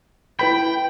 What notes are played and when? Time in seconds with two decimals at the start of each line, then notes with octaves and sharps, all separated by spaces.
0.39 E4 B4 G5 B5